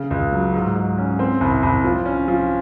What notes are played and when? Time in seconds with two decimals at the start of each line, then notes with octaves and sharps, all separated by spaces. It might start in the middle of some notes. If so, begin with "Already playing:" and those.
Already playing: C#3
0.10 C#2
0.32 F#3
0.53 G#2
0.76 G#2
0.98 C#4
1.19 C4
1.41 C2
1.63 C2
1.84 F3
2.05 C#4
2.28 F3